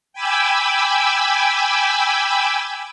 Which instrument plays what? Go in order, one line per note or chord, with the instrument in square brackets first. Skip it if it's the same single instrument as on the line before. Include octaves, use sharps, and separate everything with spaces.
[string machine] G5 G#5 B5 D6 E6